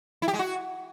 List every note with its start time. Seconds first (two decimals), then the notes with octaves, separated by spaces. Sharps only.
0.22 E4
0.28 G4
0.33 G#3
0.39 F#4